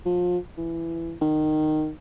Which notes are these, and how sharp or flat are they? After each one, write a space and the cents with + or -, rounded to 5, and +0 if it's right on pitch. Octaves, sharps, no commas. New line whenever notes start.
F3 +30
E3 +15
D#3 -15